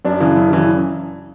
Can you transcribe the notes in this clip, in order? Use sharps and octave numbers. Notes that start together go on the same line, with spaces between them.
F#2 D4
C#3 E3
F#2
C#3 E3